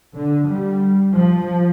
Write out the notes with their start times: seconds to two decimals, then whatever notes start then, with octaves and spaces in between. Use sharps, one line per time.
0.16 D3
0.48 G3
1.12 F3